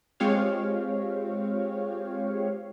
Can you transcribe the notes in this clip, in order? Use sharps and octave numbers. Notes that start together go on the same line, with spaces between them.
G#3 C4 F4 G4 C#5 F5